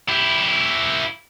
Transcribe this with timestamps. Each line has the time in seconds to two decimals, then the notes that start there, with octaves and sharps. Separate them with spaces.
0.09 E4 G4